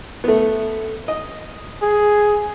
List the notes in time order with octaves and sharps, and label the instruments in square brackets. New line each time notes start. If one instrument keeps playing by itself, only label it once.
[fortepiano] A3 B3
D#5
[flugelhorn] G#4